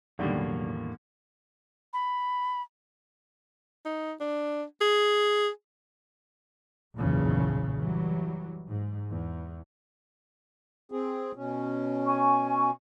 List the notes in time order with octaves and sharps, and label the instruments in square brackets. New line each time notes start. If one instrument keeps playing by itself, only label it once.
[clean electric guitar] B1 [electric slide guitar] E2 A2 A#3 [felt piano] D3 D#3 G3
[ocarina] B5
[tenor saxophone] D#4
D4
G#4
[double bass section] F#1 B1 E2 A#2 C#3 F3
E3 F#3 G3
G#2
E2
[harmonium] C4 G#4
B2 C#4
[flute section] G#5 C#6